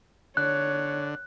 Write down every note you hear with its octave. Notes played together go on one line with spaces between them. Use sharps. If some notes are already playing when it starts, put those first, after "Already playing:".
D3 C#5 F#6